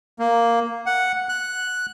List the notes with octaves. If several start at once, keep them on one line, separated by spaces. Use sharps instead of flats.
A#3
F#5
F#6